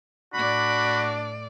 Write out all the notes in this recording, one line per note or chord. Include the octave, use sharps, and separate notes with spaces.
A2 D4 F#4 D5 B5